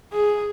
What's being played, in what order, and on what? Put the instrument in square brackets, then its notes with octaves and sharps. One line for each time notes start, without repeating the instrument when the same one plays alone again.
[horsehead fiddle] G#4